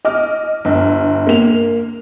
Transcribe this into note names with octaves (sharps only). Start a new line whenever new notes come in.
D#5 D6 F6
G1
A#3 F7